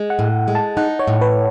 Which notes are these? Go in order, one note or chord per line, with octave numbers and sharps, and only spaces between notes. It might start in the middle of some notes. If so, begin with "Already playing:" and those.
Already playing: G#3
F#5
A2
G#3
A5
D#4 F#5
C#5
A2
B4